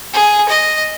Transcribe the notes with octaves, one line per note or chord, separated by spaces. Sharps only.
G#4
D#5